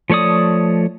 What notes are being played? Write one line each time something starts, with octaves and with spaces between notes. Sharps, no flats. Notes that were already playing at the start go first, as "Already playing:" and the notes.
F3 A3 C#5 D5 D#6